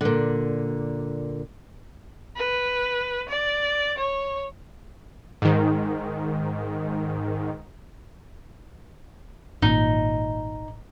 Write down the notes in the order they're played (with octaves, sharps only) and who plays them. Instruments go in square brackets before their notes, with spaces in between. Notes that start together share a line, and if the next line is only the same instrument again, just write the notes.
[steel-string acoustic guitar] A#2 D3
[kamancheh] B4
D5
C#5
[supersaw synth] G#2 D#3
[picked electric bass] G#1 A#2 [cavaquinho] D#4